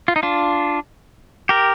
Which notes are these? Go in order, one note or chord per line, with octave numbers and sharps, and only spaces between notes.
F4
D#4
D4 F4
G4 A#4